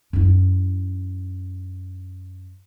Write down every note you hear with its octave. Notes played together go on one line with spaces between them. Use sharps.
F#2 E4